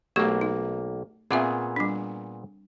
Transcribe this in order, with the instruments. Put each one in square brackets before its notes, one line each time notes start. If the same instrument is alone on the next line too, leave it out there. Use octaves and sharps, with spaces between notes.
[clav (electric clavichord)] B1 A#3 [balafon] A3 G4 C#6
[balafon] D#4
[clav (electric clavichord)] A#2 B3 G#4 [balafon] C4 F4 E5
[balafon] G3 D4